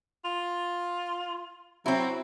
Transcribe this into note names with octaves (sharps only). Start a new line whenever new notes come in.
F4
F#3 C4 E4